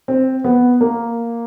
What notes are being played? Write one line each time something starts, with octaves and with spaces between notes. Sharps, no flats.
C4
B3
A#3